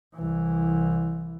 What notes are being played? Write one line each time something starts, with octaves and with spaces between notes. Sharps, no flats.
C2 E3